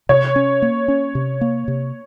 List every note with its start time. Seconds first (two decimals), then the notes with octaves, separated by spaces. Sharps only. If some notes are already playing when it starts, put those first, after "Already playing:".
0.09 C3 C#5
0.36 C#4
0.62 A#3
0.88 C#4
1.15 C3
1.41 A#3
1.68 C3